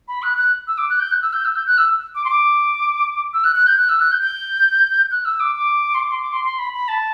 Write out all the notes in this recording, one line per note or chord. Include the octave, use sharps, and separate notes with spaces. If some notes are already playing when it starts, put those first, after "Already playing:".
B5
F#6
F#6
E6
D6
F#6
G6
F#6
E6
G6
E6
G6
F#6
E6
D6
C6
D6
E6
F#6
F#6
G6
F#6
E6
F#6
G6
G6
F#6
E6
D6
D6
C6
D6
C6
D6
C6
C6
B5
B5
A5